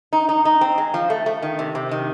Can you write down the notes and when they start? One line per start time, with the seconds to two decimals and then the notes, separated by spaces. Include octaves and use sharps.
0.13 D#4
0.29 D#4
0.45 D#4
0.61 C4
0.78 G#3
0.94 F3
1.10 A3
1.26 A3
1.42 D#3
1.59 C3
1.75 C3
1.91 D#3